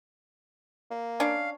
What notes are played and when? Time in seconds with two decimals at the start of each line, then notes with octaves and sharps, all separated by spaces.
0.91 A#3
1.20 C#4 D4 F5